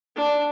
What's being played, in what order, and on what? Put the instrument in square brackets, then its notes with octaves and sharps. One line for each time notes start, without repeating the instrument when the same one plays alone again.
[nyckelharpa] D4